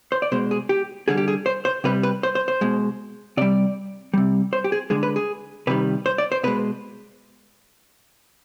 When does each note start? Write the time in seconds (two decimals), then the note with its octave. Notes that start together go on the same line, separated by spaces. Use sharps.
0.12 C5
0.22 D5
0.32 B2 G#3 C5
0.51 G#4
0.69 G4
1.08 D3 G3 G#4
1.17 G4
1.28 G#4
1.46 C5
1.65 C5
1.84 C3 G3 B4
2.03 B4
2.23 C5
2.35 C5
2.48 C5
2.61 B2 G#3
3.37 C3 G3 D5
4.14 C3 G3
4.53 C5
4.64 G4
4.72 G#4
4.90 D3 G#3 G#4
5.03 B4
5.16 G#4
5.67 C3 D#3 G3 B4
6.06 C5
6.18 D5
6.32 C5
6.43 B2 G#3 B4